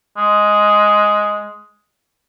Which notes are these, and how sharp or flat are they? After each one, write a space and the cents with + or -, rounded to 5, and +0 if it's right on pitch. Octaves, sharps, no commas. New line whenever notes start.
G#3 +5